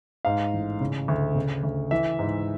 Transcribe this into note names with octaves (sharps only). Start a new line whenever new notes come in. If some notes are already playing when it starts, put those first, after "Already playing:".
G#2 F5
A1
C#3
D2
C#3
D2
E3 E5
G#2